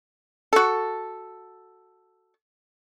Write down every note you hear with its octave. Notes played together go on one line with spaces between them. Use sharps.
F#4 A4